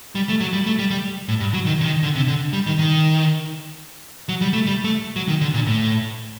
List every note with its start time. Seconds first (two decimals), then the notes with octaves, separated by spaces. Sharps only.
0.15 G3
0.29 A3
0.40 F#3
0.53 G3
0.66 A3
0.79 G3
0.91 G3
1.28 A2
1.40 G2
1.54 F#3
1.66 D#3
1.81 D3
1.85 D#3
2.03 D3
2.15 C3
2.28 D3
2.53 G3
2.66 D#3
2.79 D#3
4.29 F#3
4.41 G3
4.53 A3
4.66 G3
4.84 A3
5.16 F#3
5.28 D#3
5.41 D3
5.54 A#2
5.66 A2